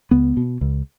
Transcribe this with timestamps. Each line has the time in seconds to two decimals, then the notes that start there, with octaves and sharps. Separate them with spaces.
0.11 C#2 B3
0.37 B2
0.61 C#2